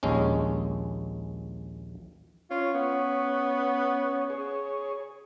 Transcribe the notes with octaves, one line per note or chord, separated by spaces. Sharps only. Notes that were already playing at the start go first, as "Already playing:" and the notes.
A#1 D#2 G#3 C#4
C#4 F4 C#5
B3
G#4 C#5